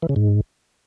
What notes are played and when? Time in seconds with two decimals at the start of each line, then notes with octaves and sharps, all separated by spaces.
0.02 E3
0.09 C#3
0.16 G#2